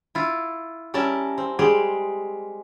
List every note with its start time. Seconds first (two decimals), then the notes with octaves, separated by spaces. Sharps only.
0.15 E4 F4
0.94 G3 C#4 A#4 E5 A5
1.38 C4
1.59 G3 G#3 G4 G#4